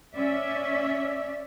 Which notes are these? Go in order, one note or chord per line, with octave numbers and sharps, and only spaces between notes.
C#4 D5 E5